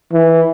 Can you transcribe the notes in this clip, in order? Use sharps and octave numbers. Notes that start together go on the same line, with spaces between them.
E3